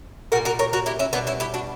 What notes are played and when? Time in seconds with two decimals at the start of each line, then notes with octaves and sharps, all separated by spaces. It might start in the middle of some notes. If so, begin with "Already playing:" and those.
0.32 A#2 G3 F#4 A#4
0.45 F#4 A#4
0.59 A#4 C#5
0.73 F#4 A#4
0.86 E4 G4
0.99 C#4 E4
1.13 B2 G3 B3 D4
1.27 C#4 E4
1.40 E4 G4
1.54 D4 F#4